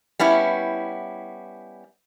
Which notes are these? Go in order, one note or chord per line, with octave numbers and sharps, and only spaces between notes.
G3 B3 C#4 E4